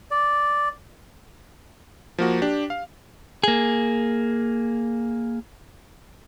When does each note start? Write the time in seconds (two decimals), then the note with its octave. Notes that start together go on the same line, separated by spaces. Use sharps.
0.11 D5
2.18 F3 A#3 F#4
2.42 D4 G4
2.70 F5
3.43 A#3 G#4